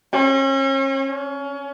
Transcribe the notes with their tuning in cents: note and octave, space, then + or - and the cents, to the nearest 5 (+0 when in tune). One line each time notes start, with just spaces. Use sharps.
C#4 -40
C#4 +25